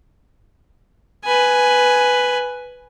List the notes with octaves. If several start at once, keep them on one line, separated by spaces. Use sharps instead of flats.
B4 G#5